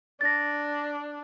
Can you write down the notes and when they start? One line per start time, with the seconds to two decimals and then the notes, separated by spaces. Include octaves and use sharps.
0.21 D4 A6 A#6